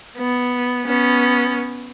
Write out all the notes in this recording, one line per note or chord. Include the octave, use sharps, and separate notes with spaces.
B3
B3 C#4